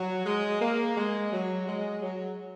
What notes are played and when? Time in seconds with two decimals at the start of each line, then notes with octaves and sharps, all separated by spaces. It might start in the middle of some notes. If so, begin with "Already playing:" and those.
Already playing: F#3
0.26 G#3
0.60 A#3
0.96 G#3
1.31 F#3
1.67 G#3
2.02 F#3